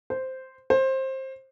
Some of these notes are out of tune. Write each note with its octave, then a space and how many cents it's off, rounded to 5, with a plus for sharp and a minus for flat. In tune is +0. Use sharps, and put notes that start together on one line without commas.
C5 -5
C5 +20